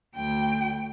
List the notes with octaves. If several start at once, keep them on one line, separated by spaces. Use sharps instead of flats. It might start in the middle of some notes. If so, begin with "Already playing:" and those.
D2 G5